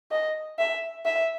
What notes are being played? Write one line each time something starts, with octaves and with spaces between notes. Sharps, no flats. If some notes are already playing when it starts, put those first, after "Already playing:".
D#5
E5
E5